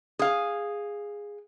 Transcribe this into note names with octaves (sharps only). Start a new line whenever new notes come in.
G#4 F5